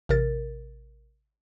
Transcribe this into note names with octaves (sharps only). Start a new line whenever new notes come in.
A1 C3 A#4 A6